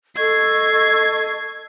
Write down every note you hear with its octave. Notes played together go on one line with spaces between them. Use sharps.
A4 D#5 C#6 G#6 C7